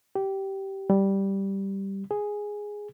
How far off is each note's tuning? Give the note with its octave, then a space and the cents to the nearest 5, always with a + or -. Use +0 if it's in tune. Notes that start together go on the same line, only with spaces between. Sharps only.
G4 -15
G3 -5
G#4 +0